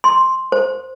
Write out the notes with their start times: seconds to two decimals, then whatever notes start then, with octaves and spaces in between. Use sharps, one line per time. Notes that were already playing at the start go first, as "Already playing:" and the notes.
0.04 C6
0.52 C5